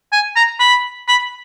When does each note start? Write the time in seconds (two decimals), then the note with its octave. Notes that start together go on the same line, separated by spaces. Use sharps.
0.13 G#5
0.36 A#5
0.60 B5
1.08 B5